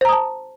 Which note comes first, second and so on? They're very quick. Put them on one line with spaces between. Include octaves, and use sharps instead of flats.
C5 A#5 D#6 A5